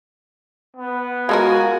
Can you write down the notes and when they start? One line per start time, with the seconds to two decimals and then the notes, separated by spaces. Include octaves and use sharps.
0.77 B3
1.29 G#3 F4 F#4 A4 A#4 G#5